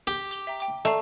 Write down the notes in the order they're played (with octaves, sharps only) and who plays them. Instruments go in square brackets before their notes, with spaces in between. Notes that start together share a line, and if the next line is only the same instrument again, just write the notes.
[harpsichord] G4
[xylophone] D6 F7 G7
E5 G5 A#5
G5 D6
[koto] A3 [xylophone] D5 A#5 C7